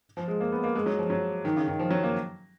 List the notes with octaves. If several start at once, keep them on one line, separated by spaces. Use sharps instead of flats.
F3
G#3
A#3
B3
A#3
G#3
F#3
F3
F#3
D#3
C#3
D#3
F3
F#3
A#3